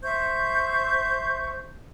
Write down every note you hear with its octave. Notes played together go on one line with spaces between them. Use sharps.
C5 E5 C#6 G6